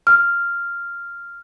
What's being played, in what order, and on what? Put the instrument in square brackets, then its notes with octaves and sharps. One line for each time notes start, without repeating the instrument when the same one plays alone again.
[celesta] F6